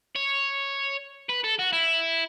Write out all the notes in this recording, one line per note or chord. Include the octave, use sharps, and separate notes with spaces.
C#5
B4
A4
F#4
E4